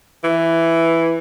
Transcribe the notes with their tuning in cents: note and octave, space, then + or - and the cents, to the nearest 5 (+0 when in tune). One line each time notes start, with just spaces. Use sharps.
E3 +5